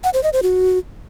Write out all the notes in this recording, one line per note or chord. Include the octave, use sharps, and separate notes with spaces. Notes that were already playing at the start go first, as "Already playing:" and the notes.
F#5
C5
D#5
C5
F#4